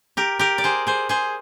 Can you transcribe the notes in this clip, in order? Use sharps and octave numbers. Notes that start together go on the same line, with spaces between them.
G4 A#4
G4 A#4
D5
G#4 C5
G#4 C5
G#4 C5